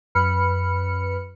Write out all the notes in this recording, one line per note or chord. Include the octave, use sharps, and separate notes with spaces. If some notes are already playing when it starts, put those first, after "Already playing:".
F#2 B4 B5 F6 C#7